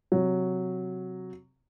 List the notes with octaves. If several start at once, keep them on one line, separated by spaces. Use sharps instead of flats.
C3 F#3